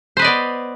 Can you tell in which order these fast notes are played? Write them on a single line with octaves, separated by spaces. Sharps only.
C5 B4 D#5 D5 B3